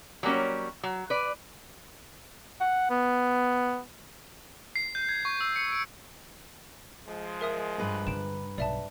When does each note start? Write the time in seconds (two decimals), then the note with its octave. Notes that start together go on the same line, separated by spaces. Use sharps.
0.23 F#3 G3 A#3 C#4
0.83 F#3
1.10 B4 D5
2.61 F#5
2.90 B3
4.76 C7
4.95 G6
5.09 G#6
5.25 C#6
5.41 E6
5.56 C#7
5.72 D7
7.08 F3 G#3
7.41 A#4 E5 D#6
7.78 G2 B4 A#5
8.07 D3 D7 E7
8.58 B1 D5 E5 A5